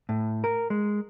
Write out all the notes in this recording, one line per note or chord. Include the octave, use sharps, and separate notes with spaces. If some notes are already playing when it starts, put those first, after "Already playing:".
A2
A#4
G#3